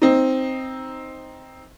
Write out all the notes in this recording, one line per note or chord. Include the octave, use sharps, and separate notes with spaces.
C4 D#4